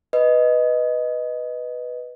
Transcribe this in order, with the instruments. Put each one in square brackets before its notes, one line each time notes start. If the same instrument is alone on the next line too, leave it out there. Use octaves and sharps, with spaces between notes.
[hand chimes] B4 D#5